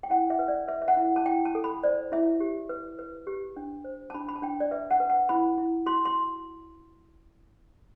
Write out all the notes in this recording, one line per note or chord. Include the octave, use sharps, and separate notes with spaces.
G5
E4 F#5
E5
B4
D5
B4 E5
E5
F#5
E4
A5
E4 G5
A5
A4
B5
C5 D5
E4 E5
G4
B4
B4
G4
D4
C5
A5
D4 B5
B5
A5
D4 G5
D5
B4 E5
F#5
B4
F#5
E4 B5
E4
F#4 C6
C6